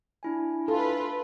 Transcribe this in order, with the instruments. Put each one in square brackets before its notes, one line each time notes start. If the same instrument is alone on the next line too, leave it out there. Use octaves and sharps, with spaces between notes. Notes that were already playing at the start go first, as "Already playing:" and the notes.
[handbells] D4 E4 G#5
[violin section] F4 B4 [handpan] A4